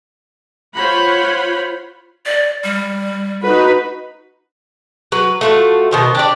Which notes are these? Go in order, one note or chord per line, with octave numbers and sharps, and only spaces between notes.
F4 C5 C#5 F#5 B5
D5
G3
D#4 F#4 B4
F#3 B4
A3 F4 F#4
B2 D#3 C5
D4 G4 D5